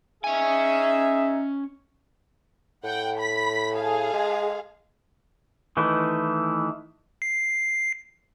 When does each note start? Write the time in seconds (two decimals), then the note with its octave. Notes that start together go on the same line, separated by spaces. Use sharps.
0.24 C#4 D#4 G#4 E5 G#5
2.84 A2 F#5 G5
3.19 B5 B6
3.74 G#4 A4 F5
4.13 G#3
5.77 D#3 E3 A3 E4
7.22 C7